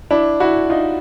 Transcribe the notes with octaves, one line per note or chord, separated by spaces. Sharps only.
D4 E4
E4 F#4
D#4 F4